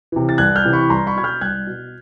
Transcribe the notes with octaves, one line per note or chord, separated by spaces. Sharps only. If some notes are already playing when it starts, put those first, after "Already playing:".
C3 E3
A6
C2 F#6 G#6
F6 G6
C3 E3
B5 C#6
C2 A#5 C6
B5 C#6
B2 G#6
F6 G6
C2 F#6 G#6
B2